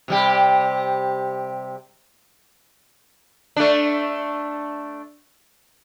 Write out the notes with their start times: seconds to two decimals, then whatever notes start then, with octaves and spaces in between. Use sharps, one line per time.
0.08 C3 G3 G4
3.56 A3 D4